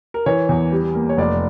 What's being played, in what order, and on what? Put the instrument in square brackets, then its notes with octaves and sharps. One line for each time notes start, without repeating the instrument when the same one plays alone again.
[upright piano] A#4
E3 C#5
E2
G3
A#3
C#5
F1 D5